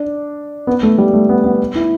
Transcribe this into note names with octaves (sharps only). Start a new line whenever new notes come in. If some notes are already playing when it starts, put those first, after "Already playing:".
Already playing: D4
B3
A3
G3
A3
B3
B3
E4